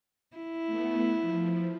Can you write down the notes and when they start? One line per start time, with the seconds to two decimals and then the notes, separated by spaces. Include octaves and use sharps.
0.37 E4
0.66 A3 B3
1.21 F3